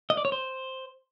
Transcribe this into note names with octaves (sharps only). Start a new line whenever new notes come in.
D#5
D5
C#5
C5